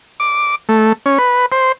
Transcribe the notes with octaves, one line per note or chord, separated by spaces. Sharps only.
D6
A3
C#4
B4
C5